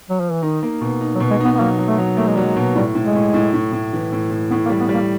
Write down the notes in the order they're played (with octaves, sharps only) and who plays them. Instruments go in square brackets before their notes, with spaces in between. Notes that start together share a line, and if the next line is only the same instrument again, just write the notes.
[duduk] F#3
F3
E3
[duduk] D#3 [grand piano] D#4
[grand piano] A#3
B2
D#4
[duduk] F#3
[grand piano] B2
[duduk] G#3
[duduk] B3 [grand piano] D#4
[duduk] B3
[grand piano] F#3 [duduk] A#3
[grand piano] F#3
[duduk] A3
[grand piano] F#3
[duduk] A3 [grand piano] A#3
[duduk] G#3
[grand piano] F#3 [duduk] G3
[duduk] G#3
[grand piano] B2
[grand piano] A2 [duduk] G3
[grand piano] A2
[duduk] G#3
[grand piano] A2
A2
A2
A2
E3
A2
A2
[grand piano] A2 [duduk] B3
[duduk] A#3
[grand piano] G3
[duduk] B3
[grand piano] G3 [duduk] A#3